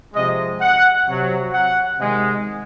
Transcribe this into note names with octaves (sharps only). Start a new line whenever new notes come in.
C3 F3 G#3 D#5
F#5
C3 F#3
F#5
C3 D#3 G#3